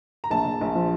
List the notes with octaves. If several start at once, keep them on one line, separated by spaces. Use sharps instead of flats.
A#5
A#1 A5
A#1
A#1
F3